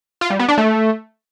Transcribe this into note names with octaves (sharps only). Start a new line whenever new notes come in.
F4
G3
B3
D4
A3